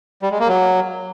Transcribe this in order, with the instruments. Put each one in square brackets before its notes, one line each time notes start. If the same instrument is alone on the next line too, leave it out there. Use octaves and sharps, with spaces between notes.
[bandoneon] G3
G#3
A#3
F#3